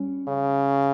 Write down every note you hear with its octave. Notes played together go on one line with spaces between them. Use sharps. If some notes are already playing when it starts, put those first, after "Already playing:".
Already playing: G3 C#4
C#3